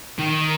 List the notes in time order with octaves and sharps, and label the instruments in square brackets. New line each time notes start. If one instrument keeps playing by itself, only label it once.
[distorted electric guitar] D#3